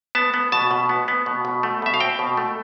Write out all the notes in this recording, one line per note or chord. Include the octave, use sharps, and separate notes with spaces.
B3 A5
B3
B2 A5
B2
B3
B3
B2
B2
A3
B2 E5
F5
C4 G5
B2
A3